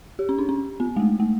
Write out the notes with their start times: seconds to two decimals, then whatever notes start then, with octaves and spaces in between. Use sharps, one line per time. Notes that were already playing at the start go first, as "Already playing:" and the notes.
0.19 G4
0.29 C#4
0.38 D4
0.49 C#4
0.80 B3
0.96 G#3
1.00 A3
1.20 A3